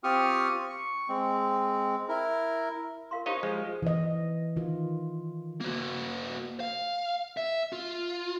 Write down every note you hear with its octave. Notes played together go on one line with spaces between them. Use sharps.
C4 F4 G4 C#6 D#6 F6
C#6
G#3 C4
E4 A#4
A#4 F5 C6
D#4 G4 C5 C#5 D#5 F5
F3 G#3
E3 D#5
D#3 F4
A#3 F#4
F5
E5
F4